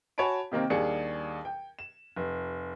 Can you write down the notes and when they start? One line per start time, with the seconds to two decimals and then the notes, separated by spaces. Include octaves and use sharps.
0.18 F#4 C#5 G#5 A5 B5 D7
0.52 C3 D#3 A#3 C4
0.70 D#2 G3 D4 G#4 C#7
1.45 G5
1.79 E7
2.16 F1